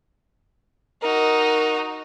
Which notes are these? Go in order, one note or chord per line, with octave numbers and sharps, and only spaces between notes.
D#4 F#4 A#4